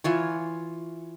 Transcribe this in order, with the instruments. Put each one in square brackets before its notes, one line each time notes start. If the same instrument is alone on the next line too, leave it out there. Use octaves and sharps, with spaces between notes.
[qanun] E3 F4 C#5